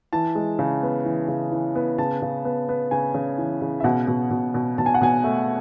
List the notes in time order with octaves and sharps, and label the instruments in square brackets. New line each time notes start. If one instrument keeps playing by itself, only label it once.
[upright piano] E3 A5
G#3
C#3
B3
E3
C#3
E3
B3
C#3 A5
C#3
B3
B3
C#3 G#5
C#3
E3
C#3
E5
B2 F#5
B2
B2
B2
B2 A5
G#5
F#5
B2 G#5
A3